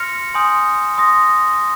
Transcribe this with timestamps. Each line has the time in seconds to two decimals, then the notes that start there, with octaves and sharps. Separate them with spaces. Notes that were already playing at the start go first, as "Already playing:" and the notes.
Already playing: C6 F6 A#6 C#7 F7
0.34 G#5 C6 D#6 G6
0.98 C6 D#6 A#6